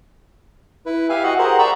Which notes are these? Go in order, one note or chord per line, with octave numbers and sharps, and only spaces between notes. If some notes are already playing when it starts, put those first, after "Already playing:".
E4 B4
G4 E5 F5 G#5
F#4 D#5 F#5
G4 G#4 A#4 C5 F#5
D5 F#5 A#5 B5 C#6 E6